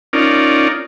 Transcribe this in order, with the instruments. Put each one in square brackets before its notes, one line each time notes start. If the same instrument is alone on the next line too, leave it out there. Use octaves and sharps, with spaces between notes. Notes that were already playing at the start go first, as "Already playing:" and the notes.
[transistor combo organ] C#4 D#4 F4 A#4 D5